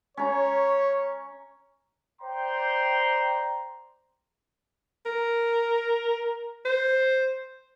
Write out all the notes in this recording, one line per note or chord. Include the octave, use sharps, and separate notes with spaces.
C#4 C#5 A#5
C5 D5 G5 A#5 C6
A#4
C5